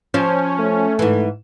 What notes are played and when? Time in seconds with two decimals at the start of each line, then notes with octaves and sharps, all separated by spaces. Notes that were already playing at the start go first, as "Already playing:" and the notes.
0.14 F3 C#4 C5
0.59 A3
0.99 G#2 E3